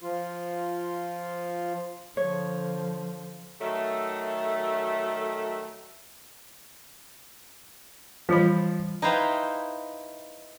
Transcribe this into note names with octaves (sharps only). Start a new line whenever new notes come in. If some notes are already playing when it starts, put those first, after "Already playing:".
F3 F4
D3 F3 C#5
D#3 F#3 A3
E3 F3 G3 B5
D#4 E4 B4 C5 F5 G5